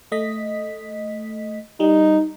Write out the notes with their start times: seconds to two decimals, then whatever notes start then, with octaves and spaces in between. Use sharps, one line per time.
0.12 A3 D#5 B6
1.80 G3 D#4